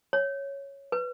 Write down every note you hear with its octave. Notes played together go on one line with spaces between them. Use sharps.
C#5
B4